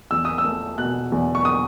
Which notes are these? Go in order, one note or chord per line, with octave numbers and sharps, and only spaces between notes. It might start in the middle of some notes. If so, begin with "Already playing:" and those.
E2 E6
D#6
E6
A3
B2 F#6
E2
C#6
D#6